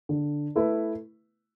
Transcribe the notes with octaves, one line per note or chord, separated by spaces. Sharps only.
D3
A3 E4 B4